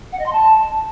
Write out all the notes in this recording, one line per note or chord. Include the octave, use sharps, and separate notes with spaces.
F#5
D#5
C6
A5